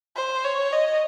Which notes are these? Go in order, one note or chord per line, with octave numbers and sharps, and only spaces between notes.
C5
C#5
D#5